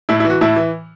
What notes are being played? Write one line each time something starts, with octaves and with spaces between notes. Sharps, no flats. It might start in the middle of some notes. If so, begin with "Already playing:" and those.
A2 E4
E4
E3
F#4
A2 E4
E3